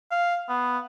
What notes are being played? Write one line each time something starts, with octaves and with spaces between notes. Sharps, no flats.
F5
B3